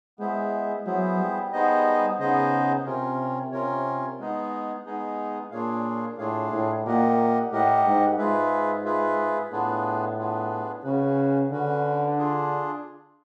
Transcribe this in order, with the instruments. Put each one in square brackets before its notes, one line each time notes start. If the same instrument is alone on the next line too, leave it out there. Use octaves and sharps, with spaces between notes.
[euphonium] G#3 [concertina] B3 E4 G#4 C5 E5
[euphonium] F#3 [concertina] B3 E4 G#4 C5 E5
[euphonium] G3
[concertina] B3 D#4 G#4 C5 D#5
[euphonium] C#3 [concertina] B3 D#4 G#4 C5 D#5
[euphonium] C3 [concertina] C#4 F4 A#4 C#5
[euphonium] C3 [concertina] C#4 F4 A#4 C#5
[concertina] G#3 B3 D#4 G#4
G#3 B3 D#4 G#4
[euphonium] A#2 [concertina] D4 F4 G#4 C#5 F5
[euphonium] A2 [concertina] D4 F4 G#4 C#5 F5
[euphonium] A2
[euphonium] A#2 [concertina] G4 A#4 D#5 F#5
[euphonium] A2 [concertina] G4 A#4 D#5 F#5
[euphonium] G#2
[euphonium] G#2 [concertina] F4 G#4 B4 E5
[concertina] F4 G#4 B4 E5
[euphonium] A2 [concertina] B3 D4 F4 G#4 B4
[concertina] B3 D4 F4 G#4 B4
[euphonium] C#3 [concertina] C#4 F#4 B4
[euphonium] D3 [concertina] C#4 F#4 B4
[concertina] D4 F4 G#4